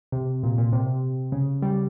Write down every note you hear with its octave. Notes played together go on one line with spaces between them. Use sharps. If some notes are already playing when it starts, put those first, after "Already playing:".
C3
A#2
A#2
C3
C#3
G3